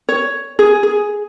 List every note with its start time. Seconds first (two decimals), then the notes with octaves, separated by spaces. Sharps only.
0.09 C#5
0.59 G#4
0.83 G#4